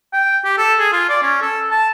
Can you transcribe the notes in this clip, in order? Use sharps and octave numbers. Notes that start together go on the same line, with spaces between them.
G5
G4
A4
G#4
F4
D5
C#4
A4
A5